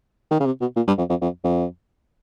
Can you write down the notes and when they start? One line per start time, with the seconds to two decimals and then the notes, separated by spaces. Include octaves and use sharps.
0.31 D#3
0.40 C#3
0.46 C3
0.61 B2
0.76 A#2
0.87 G2
0.98 F2
1.10 F2
1.22 F2
1.44 F2